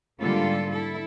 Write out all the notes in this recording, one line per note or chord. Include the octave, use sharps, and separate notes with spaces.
G#2 D3 G3 A#3 F4 A4
E4 A4